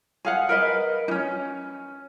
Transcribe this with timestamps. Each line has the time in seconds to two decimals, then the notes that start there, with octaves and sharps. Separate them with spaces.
0.25 G#4 F5 F#5
0.49 A#4 B4 D#5
1.08 C#4 D#4